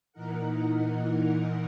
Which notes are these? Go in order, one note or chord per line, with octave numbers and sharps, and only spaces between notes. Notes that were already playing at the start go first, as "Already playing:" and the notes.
A#2 E3 D#4 A#4 F#5